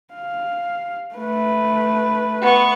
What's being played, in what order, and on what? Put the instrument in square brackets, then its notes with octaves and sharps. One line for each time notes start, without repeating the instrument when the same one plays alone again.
[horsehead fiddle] F5
A3 B4
[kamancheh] B3 C#6